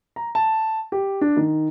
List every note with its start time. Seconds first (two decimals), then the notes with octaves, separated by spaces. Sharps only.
0.16 A#5
0.35 A5
0.92 G4
1.21 D4
1.37 D#3